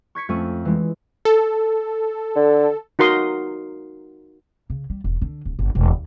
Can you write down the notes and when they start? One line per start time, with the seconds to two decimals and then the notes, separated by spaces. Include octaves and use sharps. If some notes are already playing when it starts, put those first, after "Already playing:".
0.15 C#6 G#6 B6 C#7
0.29 F2 A3 C#4 C#6 D#7
0.65 E3 G#3
1.25 A4
2.36 D3
2.99 D#4 F#4 A#4 C6 D#6
4.70 C#3
4.90 G3
5.04 E1
5.22 D3
5.45 D1
5.59 G1
5.75 E1
5.91 D#2